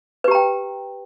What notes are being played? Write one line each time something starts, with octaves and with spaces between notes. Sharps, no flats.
G4 B4 G5 A#5